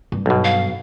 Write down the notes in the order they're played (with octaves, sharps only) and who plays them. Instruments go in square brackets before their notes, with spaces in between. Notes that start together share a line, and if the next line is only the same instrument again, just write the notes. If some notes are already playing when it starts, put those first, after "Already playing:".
[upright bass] G2
[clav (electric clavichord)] B1 B2
[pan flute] F5